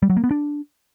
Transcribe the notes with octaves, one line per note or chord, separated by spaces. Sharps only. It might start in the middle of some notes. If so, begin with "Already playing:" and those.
G3
F#3
A#3
B3
D4